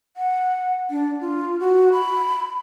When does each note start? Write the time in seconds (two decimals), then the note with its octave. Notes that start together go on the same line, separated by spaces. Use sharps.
0.17 F#5
0.90 D4
1.21 F4
1.60 F#4
1.93 B5